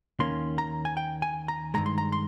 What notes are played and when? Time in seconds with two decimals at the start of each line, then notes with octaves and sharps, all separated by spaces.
0.19 D#2 D#3 A#3 C#4 C6
0.58 A#5
0.85 G#5
0.97 G5
1.22 G#5
1.48 A#5
1.74 G2 D#3 G#3 A#5
1.86 C6
1.98 A#5
2.12 C6